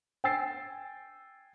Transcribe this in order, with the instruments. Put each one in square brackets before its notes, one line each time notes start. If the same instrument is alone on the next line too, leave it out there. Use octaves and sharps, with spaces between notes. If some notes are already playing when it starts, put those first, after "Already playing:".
[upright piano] G5 G#5 E6 A6 C7